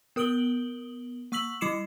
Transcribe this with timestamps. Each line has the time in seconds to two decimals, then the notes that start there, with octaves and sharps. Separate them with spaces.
0.16 B3 A#4 D#6 D7 F#7 G7
1.32 A#3 C#6 E6 B6 F#7
1.61 G3 E4 D6 C7 C#7 E7